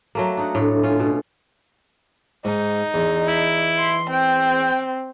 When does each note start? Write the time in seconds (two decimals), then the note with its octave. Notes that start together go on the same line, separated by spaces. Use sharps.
0.15 F#3 A3 A#3
0.37 D4 D#4 F#5
0.55 A2 D4 A4
0.83 C#4 F4
1.00 B2
2.45 G#2 D#4
2.94 E2
3.27 E4
3.78 C6
4.10 C4 G5